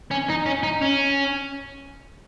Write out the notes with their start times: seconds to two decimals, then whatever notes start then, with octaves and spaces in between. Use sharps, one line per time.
0.11 C#4
0.29 D#4
0.46 C#4
0.63 D#4
0.82 C#4